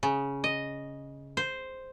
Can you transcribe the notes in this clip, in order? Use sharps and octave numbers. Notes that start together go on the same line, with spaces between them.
C#3
D#5
C5